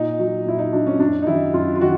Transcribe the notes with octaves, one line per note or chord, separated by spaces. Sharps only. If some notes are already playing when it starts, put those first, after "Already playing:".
Already playing: A#2 D#4
F#3
A#2 E4
D#4
F#3 D4
C#4
F#2 D4
D#4
D#3 F#3 E4
F#2 F4
F4
D#3 F#4